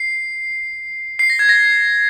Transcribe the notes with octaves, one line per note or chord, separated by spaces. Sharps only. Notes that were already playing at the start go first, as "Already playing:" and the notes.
Already playing: C7
C7
A#6
G#6
A#6